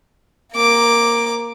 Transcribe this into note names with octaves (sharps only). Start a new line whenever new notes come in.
A#3 D6